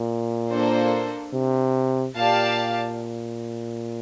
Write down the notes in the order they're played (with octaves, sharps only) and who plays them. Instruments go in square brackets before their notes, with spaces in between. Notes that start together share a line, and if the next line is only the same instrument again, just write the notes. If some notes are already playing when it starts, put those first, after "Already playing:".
Already playing: [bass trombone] A#2
[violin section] A#3 D4 A4 C5
[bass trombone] C3
[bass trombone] A#2 [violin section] G4 D5 F5 A5